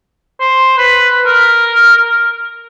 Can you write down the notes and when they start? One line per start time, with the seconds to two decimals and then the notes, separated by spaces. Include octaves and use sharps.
0.40 C5
0.77 B4
1.26 A#4